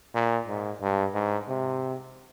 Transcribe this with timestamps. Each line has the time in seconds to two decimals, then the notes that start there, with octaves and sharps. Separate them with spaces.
0.15 A#2
0.48 G#2
0.82 G2
1.15 G#2
1.49 C3